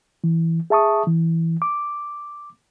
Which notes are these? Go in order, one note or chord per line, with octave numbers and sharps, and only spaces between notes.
E3
G#4 E5 A5 C#6 D#6
E3
D6